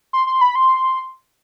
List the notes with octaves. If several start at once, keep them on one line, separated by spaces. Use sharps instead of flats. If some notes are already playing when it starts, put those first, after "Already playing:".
C6
C6
B5
C6